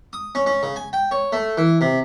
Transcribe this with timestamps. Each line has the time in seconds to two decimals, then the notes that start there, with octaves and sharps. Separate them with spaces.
0.13 D#6
0.35 C#4
0.46 C#4
0.63 C#3
0.76 G#5
0.93 G5
1.11 C#5
1.32 A3
1.57 E3
1.81 C3